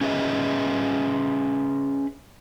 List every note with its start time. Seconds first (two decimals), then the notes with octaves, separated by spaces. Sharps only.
0.01 C#4 G#4 B4 D#5 E5